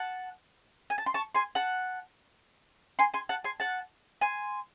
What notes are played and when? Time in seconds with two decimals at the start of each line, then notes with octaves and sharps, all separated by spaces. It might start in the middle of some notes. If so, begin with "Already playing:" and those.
Already playing: F#5 A5
0.90 G#5
0.98 A5
1.06 C6
1.14 A5 C#6
1.35 G#5 C6
1.55 F#5 A5
2.99 G#5 C6
3.14 G#5 C6
3.29 F#5 A5
3.44 G#5 C6
3.60 F#5 A5
4.21 G#5 C6